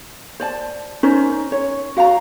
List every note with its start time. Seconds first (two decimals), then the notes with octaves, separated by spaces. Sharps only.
0.40 C5 D5 A5
1.03 C#4 D#4 A#4 C5
1.52 C#5
1.97 F#4 F5 G5 A#5